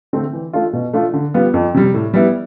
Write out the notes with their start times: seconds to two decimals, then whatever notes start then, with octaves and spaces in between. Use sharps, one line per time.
0.13 D3 A3 C4
0.33 E3
0.53 A3 D4 F4
0.73 B2
0.93 A3 D4 F4
1.13 D3
1.34 G3 B3 F4
1.54 F2
1.74 C3 G3
1.94 A2
2.14 G3 B3 E4